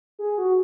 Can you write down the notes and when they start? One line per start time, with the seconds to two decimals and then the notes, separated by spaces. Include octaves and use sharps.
0.19 G#4
0.38 F#4